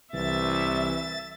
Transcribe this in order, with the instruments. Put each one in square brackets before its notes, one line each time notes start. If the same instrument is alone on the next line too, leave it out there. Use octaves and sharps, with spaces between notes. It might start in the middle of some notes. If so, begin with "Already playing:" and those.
[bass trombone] C2 [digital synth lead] E3 [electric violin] E5 [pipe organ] A6